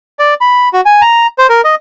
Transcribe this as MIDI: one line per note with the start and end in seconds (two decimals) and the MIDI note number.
0.19 0.34 74
0.41 0.69 83
0.73 0.81 66
0.86 1.01 80
1.01 1.27 82
1.38 1.47 72
1.49 1.61 70
1.64 1.75 75